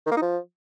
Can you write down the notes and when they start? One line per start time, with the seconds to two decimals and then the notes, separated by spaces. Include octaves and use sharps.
0.06 D#3
0.11 A#3
0.17 D#4
0.22 F3